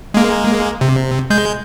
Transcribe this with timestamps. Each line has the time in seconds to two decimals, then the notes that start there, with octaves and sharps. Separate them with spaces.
0.14 G#3 A#3
0.81 C3
1.30 G#3 G6